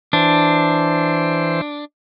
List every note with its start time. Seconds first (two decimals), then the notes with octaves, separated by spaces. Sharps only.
0.13 E3 D4 C5